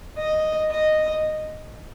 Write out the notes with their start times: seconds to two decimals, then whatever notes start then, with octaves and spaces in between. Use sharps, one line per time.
0.17 D#5
0.71 D#5